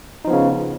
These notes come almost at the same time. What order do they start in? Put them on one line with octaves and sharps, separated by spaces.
D#4 F3 B3 C#3